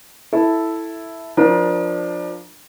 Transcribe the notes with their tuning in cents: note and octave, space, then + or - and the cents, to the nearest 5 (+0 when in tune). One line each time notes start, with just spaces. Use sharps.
E4 +0 A4 +0
F3 +20 D4 +20 A#4 +40